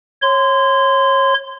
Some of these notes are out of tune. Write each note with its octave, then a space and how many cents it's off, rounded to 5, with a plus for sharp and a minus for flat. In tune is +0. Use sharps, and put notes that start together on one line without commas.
C#5 -25 C6 -20